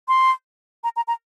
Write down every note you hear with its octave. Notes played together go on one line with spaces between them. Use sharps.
C6
A#5
A#5
A#5